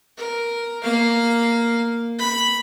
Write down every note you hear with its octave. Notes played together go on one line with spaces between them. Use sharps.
A#4
A#3 F5
B5